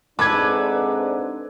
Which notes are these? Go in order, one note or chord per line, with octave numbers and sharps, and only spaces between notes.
G#2 C3 D4 A4 B4 D6 G#6